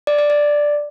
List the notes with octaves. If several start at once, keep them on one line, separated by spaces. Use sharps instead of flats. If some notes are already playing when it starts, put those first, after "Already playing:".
D5
D5
D5